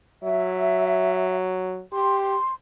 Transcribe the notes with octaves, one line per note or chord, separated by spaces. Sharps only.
F#3 E5
G4 C6